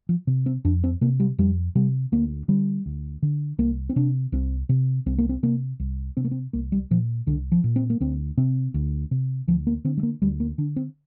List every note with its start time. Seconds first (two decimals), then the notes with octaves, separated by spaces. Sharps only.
0.09 F3
0.27 C3
0.46 C4
0.65 F2 D4
0.84 C4
1.01 C3 A#3
1.20 G3
1.38 F2 G3
1.75 C3 G3
2.12 D2 A#3
2.48 D3 G3
2.86 D2
3.22 D3
3.58 C2 A#3
3.89 C4
3.96 C3 D4
4.32 C2 C4
4.69 C3
5.06 C2 C4
5.18 A#3
5.29 C4
5.43 C3 A#3
5.80 C2
6.17 C3 C4
6.24 A#3
6.31 C4
6.53 C2 A#3
6.72 G3
6.91 A#2 F3
7.27 C2 D3
7.52 F3
7.64 A#2
7.76 C4
7.90 A#3
8.01 D2 C4
8.37 C3 C4
8.74 D2
9.11 C3
9.48 D2 F3
9.67 A#3
9.84 D3 C4
9.97 G3
10.03 A#3
10.22 D2 G3
10.40 A#3
10.58 D3 D4
10.76 C4